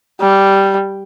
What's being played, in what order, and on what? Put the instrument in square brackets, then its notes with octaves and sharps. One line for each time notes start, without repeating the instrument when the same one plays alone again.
[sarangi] G3